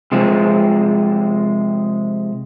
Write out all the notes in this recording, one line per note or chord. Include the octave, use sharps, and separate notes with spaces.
C3 F3 G#3